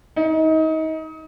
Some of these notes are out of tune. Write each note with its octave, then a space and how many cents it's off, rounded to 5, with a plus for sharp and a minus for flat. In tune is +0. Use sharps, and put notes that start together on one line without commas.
D#4 +30